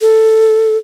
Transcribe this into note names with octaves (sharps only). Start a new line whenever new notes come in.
A4